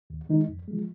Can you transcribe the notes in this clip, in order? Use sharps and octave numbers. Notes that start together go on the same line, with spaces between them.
D#2
D#3 G#3 D#4
F2
G#3
F3